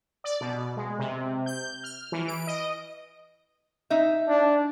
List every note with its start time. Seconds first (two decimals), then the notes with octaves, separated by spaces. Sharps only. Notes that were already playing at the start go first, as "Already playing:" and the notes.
0.24 D5
0.41 B2
0.77 G#3
0.99 C3
1.46 G6
1.84 F6
2.12 E3
2.28 D7
2.47 D#5
3.90 D#4 E5
4.29 D4